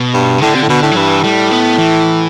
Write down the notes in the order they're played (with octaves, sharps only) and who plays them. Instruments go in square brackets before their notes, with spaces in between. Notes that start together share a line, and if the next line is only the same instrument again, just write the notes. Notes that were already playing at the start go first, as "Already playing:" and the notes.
Already playing: [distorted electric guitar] B2
[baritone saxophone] G2
[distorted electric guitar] C3
[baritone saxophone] A2 [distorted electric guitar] D3
[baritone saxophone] C3
A2
[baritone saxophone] B2 [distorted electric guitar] D3
[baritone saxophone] A2
[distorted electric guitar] F#3
[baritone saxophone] G2 [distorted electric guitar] E3
[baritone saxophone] A2 [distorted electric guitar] G3
[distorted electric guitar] B3
E3